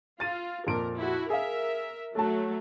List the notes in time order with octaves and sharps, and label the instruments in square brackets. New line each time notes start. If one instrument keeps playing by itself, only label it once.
[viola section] F4 [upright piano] A6 D#7
[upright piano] F2 A#2 D7 [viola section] A#4
[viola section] E4 F#4
[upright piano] G#4 F5 [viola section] A#4 E5
[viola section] F#3 A3 [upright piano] A4 A5